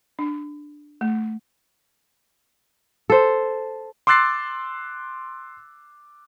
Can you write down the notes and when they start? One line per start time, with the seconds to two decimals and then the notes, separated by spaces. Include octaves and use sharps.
0.19 D4
1.01 A3
3.10 A4 C5
4.07 C6 D6 E6 F#6 A6 C7